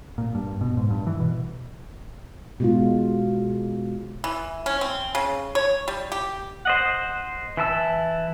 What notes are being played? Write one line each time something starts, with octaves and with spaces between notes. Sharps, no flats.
A#2
G2
B2
G#2
G2
E3
B2
B2 G#3 F4
E3
C#4
C4
C#3
C#5
G3
G4
C5 D#5 F#5
E3 E4 A5 E6